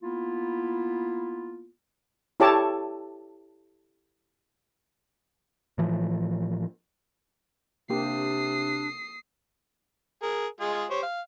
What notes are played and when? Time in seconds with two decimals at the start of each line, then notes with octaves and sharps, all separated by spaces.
0.03 A#3 B3 E4 F4
2.40 E4 G4 A4 C#5 A5 D6
5.78 A2 E3 F3
7.90 C3 A#3 D4 G4 D#6 C7
10.23 G#4 A#4
10.61 G#3 F4 G#4
10.90 G4 C5 C#5
11.03 F5